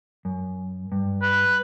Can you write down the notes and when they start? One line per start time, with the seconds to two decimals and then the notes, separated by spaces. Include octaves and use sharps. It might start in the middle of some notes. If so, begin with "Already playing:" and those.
0.25 F#2
0.92 G2
1.22 B4